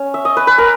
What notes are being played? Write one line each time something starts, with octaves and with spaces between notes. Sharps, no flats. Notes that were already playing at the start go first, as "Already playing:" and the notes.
Already playing: C#4
E5
D#5
B4
B4
A#4